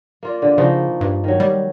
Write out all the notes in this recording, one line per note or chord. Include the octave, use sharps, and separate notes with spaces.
A#3 F4 D5
D3
C#3 F3 D#4 F#4
G2
D#3 F#3
G3